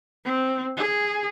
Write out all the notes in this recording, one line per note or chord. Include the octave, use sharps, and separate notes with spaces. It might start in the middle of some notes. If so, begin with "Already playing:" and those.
C4
G#4